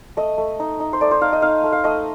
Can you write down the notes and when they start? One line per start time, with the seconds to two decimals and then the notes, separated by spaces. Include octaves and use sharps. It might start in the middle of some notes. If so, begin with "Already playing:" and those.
0.17 A3 D#5
0.38 A3
0.60 D#4
0.80 D#4
0.93 C5
1.01 A3 D5
1.11 C5
1.21 D#4 F5
1.33 D#5
1.42 D#4 F5
1.64 A3
1.72 F5
1.84 A3 D#5